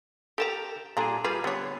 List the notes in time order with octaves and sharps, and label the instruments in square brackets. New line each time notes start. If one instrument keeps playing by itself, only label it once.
[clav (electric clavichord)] G4 A5 A#5 [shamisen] A4 A#4 G5
[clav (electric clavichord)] A#2 D4 G#4 [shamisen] G3 A4 A#5
[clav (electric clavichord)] G3 F4 G#4 [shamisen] B4
[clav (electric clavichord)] D3 B3 [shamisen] G3 C#5